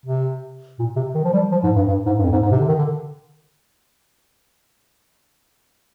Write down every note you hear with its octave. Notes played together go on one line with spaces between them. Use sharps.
C3
A#2
C3
D#3
F3
G3
F3
G#2
G2
G2
G#2
G2
F2
G#2
G#2
C3
D3
D#3
D3